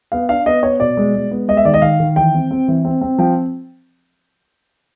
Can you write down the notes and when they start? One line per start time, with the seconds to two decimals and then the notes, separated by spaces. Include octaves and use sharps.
0.12 B3 F5
0.29 D4 F5
0.46 B3 D#5
0.63 B3 C#5
0.80 B2 D5
0.97 G#3
1.14 G#3
1.31 B3
1.48 G#3 D#5
1.57 E5
1.65 D#3 D5
1.74 D#5
1.82 D#3 F5
2.00 D#3
2.16 E3 G5
2.34 C4
2.51 C4
2.68 E3
2.85 C4
3.01 C4
3.18 F3 G5